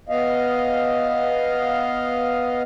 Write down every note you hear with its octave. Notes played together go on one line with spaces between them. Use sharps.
B3 D#5 F5